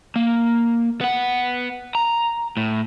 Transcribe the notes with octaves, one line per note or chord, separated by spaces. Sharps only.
A#3
B3 F#5
A#5
A2